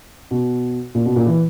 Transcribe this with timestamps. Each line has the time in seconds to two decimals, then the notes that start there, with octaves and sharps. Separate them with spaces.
0.31 B2
0.95 A#2
1.06 B2
1.16 A#2
1.27 E3